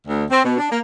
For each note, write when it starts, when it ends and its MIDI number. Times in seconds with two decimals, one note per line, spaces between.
0.06 0.23 38
0.28 0.41 60
0.41 0.55 47
0.57 0.68 62
0.69 0.78 58